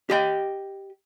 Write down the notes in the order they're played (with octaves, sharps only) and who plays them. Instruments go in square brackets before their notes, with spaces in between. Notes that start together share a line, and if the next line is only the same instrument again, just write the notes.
[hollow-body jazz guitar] G4 D#5 G5